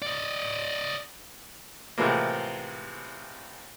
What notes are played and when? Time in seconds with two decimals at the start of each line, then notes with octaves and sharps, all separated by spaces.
0.02 D5 D#5
1.98 A2 C3 E3 F3 G#3 A#3